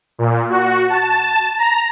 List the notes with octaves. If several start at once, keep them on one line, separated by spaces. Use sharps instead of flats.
A#2
F#4
A5
A#5